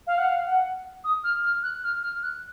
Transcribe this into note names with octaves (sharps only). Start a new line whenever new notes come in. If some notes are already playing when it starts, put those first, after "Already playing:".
F5
F#5
F5
F#5
D#6
F6
F6
F#6
F6
F6
F#6